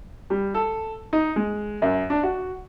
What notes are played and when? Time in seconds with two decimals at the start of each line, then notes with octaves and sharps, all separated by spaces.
0.30 G3
0.54 A4
1.13 D#4
1.36 G#3
1.82 F#2
2.10 D4
2.23 F#4